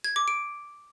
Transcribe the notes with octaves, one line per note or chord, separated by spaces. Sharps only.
G#6
D6
D7